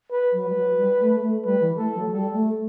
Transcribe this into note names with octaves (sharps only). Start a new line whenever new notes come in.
B4
F#3
G3 B4
F#3
G3
A3
A3
G3 B4
E3
A3 A4
F#3
G3 A4
A3